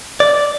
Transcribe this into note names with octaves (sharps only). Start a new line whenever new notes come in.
D5